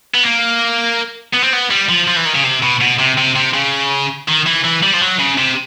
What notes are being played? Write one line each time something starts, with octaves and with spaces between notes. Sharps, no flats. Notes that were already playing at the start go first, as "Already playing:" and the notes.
B3
A#3
B3
C4
B3
G3
F3
F3
E3
D#3
C#3
C3
B2
B2
C3
C3
C3
C#3
D#3
E3
E3
G3
F3
F#3
C#3
C3